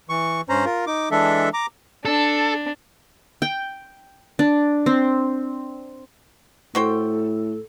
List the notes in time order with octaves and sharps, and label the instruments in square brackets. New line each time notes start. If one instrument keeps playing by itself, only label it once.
[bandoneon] E3 C#6
G2 C#4 C5 A#5
F4 A#4
D#4 D6
E3 G#3 D4 A4 E5
A#5 D6
[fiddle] D4 [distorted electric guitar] A4
[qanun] G5
D4
C4
[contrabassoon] A2 [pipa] F#4 C5 G5 [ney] A4